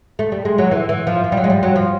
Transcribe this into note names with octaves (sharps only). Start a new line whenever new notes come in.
A3
G3
G#3
F#3
E3
E3
F3
F3
G3
F#3
G#3
G3
F#3
F3